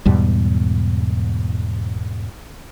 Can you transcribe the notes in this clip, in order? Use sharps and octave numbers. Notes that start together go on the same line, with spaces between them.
E2 G#2 B2 G3